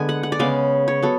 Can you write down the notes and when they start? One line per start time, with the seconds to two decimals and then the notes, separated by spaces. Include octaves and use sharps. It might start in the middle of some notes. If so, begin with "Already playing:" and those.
Already playing: D3 G#3 B3 G#5
0.09 F#5
0.23 F#5
0.32 D5
0.39 C#3 G#3 B3 F5
0.88 C#5
1.03 F#3 B3 A4